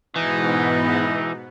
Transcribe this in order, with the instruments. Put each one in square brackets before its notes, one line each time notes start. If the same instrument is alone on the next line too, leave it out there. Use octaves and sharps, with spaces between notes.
[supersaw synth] G#2 B2 B3 [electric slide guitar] E3 [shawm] D#4